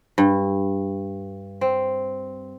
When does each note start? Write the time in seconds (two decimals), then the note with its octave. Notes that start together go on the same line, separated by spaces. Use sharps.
0.18 G2
1.61 C4